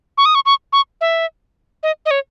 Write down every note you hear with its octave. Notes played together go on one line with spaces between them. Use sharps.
C#6
D#6
C#6
C#6
C#6
E5
D#5
D#5
C#5